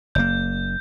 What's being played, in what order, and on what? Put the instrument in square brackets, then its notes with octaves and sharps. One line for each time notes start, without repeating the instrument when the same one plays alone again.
[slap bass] F#1 A#3 [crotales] G6